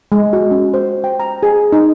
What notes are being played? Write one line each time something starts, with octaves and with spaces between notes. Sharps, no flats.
G#3
F#4
C#4
C5
G5
A#5
G#4
D#4